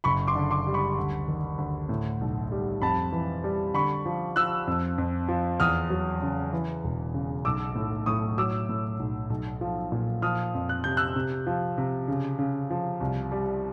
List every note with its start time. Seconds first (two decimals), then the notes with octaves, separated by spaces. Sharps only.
0.04 F#1 B5 C#6
0.27 C6 D6
0.35 D3
0.51 C6 D6
0.67 G3
0.74 B5 C#6
0.98 D2
1.28 D#3
1.58 D2
1.89 A2
2.21 B1
2.52 G3
2.82 F2 A5 B5
3.12 E3
3.44 G3
3.74 D3 B5 C#6
4.06 F3
4.36 F3 E6 F#6
4.67 F2
4.98 F2
5.29 F3
5.60 E2 D#6 F6
5.90 F#3
6.22 C#3
6.53 E3
6.84 E1
7.14 C#3
7.45 B1 D6 E6
7.75 A2
8.06 A2 C#6 D#6
8.38 F#3 D6 E6
8.69 A2
8.99 B1
9.30 B1
9.61 F3
9.92 A#2
10.22 F3 D#6 F6
10.54 F2
10.69 F#6
10.84 C3 G6
10.97 E6 F#6
11.16 C3
11.47 F3
11.78 C3
12.08 C#3
12.39 C#3
12.70 F3
13.01 C2
13.32 G3